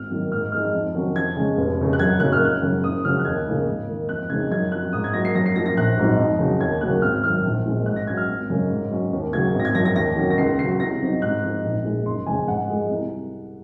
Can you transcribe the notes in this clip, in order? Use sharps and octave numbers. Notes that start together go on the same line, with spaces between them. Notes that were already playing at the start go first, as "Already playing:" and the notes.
Already playing: G#1 F6
F#2 D#3 A#3
G#2 F6
F3 G#3 D#4 F6
F2
C3 D#3 F#3 C#4
F2 G#6
C#3 G#3 C#4
F1
F2 C#3
F#6
F#2 G#6
C#3 F#3 A#3 C#4 F#6
F6
F#1 F#6
F#2 C#3
F#1 D#6
F2 C#3 F#3 F6
F#6
D#2 G#6
C#3 F3 A#3 D#4
G#2
D#3 A#3 D#4
F2 F#6
C#3 G#3 C4 D#4 G#6
F#2 G#6
F3 C4 F#6
G#2 D#6
G#6
F#3 A#3 A#6
C7
F#2 A#6
C7
F3 A#3 A#6
A#6
A#1 F#6
G#2 F#3 C4 D#4
F2
C#3 F#3
D#2 G#6
C#3 F#3 A#3 F#6
G#1 F6
F#2 D#3 F6
A#1
A#2 G#3 C4
G#2 F#6
A#6
F#3 C#4 G#6
F6
G#1
F#2 C#3 G#3 C#4
G#2
F#3 C#4
D#2
C#3 F#3 G#6
G#1 A#6
G#6
F#2 F3 A#6
A#6
D#2 A#6
D#3 F#3 C#4
A#6
C#2 C7
C#3 F#3 C7
C2 A#6
C3 F#3 C4 D#4
G#2 F#6
F3 C4 D#4
A#1
A#2 G#3 D#4
F#1 C6
F2 C#3 G#3 C4 G#5
G#2 F#5
F3 G#3
C2